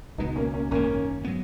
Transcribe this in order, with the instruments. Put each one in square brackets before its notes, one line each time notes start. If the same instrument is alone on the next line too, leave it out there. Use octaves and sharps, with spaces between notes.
[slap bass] C#2 B2 G#3 [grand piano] B3 D#4
[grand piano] A#3 C#4
A#3 C#4
[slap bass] G#1 F#2 D#3 [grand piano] A#3 C#4
[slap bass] F#3 B3